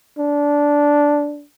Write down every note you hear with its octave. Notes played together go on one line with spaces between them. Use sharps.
D4